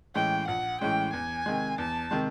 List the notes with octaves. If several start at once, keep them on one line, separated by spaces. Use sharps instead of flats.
A2 E3 G#3 C#4 G5
A#1 F#5
A2 E3 G#3 C#4 G5
E2 G#5
C3 D#3 G#3
E2 A5
C3 D#3 G#3